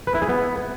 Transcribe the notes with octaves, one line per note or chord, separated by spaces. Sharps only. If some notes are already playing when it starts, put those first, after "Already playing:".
B4
E4
G#4
B3